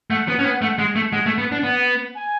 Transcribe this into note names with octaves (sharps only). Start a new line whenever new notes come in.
A3 F#5
B3
C#4
B3
A3
G#3
A3
G#3 F#5
A3
B3
D4
B3
G#5